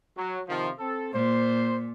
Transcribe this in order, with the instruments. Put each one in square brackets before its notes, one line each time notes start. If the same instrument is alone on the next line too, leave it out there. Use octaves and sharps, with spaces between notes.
[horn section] F#3
C3 D#3 F3
C4 A4
[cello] A#2 [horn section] C5